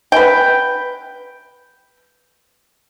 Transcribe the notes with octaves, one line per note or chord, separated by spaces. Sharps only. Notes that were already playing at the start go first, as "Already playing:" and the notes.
B4 G5